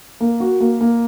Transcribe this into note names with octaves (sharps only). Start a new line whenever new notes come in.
A#3
F#4
A#3
A#3